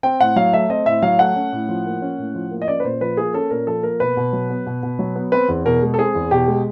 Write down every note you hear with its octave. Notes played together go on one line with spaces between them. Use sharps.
C4 G5
A2 F#5
F#3 F5
A3 E5
C4 D#5
A2 E5
F#3 F5
A3 F#5
C#4
A2
F3
A#3
C#4
A2
F3
A#3
D#5
C#4 D5
B4
A#2 C5
F3 B4
A#3 G#4
C#4 A4
A#2 A#4
F3 A4
A#3 A#4
B2 B4
B2
F#3
B3
B2
B2
F#3
B3
C4 B4
E2
B2 A#4
G#3
A4
C4 G#4
E2
B2 G4
G#3